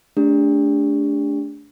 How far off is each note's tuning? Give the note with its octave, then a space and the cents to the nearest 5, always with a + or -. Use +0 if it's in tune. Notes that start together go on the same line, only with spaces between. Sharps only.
A3 -20 D4 -25 G4 +40